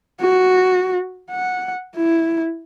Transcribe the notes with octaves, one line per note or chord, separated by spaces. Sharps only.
F#4
F#5
E4